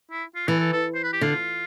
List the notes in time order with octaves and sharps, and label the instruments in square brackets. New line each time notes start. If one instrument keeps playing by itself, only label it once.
[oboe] E4
F4
[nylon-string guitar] E3 [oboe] A4
[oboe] A4
A4
C5
B4
G4
[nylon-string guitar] D3 [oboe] F4